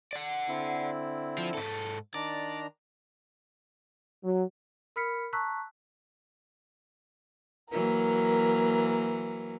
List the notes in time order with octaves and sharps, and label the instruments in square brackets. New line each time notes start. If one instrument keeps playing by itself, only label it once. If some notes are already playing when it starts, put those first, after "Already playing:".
[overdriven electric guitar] D5 F#5
[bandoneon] D3 C4 E4
[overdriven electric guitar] F3
G#2 A4
[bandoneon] D#3 D4 A#5 [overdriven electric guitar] D5
[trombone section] F#3
[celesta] A#4 B5 F6 B6 C#7
A5 A#5 C#6 E6 F#6 B6
[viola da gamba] E3 F#3 A#3 [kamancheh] A#4